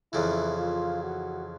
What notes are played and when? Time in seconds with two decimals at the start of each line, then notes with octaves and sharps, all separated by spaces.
0.13 F2 C#3 E3 E4
0.58 F4
1.03 F#4